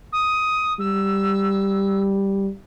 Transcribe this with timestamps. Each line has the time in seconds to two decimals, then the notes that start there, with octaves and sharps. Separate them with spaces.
0.12 D#6
0.79 G3 E6